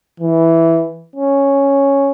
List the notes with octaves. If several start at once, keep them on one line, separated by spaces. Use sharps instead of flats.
E3
C#4